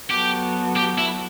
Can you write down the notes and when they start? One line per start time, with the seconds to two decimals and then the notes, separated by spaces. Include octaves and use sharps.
0.11 F#3 B3 F#4 G4 A4
0.76 G4
0.98 E4